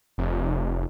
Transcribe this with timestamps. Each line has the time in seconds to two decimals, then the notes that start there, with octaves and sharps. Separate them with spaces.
0.18 F1